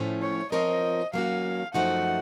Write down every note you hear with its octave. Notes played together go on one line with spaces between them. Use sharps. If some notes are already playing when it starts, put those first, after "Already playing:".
Already playing: A2 F3 A3 C#4
C#5
F3 C4 F4 A#4 C#5 D#5
F#3 A#3 C#4 F#4 F5
F#2 F3 A3 D#4 F#4 F#5